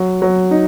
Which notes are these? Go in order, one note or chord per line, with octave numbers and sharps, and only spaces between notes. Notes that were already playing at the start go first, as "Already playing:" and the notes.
Already playing: F#3
F#3
D#4